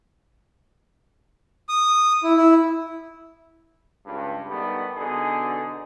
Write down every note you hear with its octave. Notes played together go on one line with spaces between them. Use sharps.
D#6
E4
E4
C#2 G2
D#3 G3 A3 B3
B2 D3 D#4 G#4